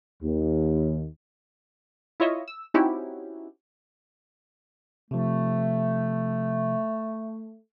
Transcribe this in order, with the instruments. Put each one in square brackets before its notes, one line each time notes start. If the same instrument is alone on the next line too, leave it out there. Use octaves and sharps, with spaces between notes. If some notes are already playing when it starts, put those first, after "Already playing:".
[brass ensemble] D#2
[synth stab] E4 F4 C#5 D#5 E5
E6
C4 C#4 D#4 E4 F#4 G4
[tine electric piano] C3 F3 [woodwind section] A3